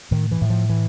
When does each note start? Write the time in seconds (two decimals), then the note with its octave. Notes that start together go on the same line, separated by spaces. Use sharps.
0.11 A2 D#3
0.32 E3
0.41 A2
0.50 F3
0.70 E3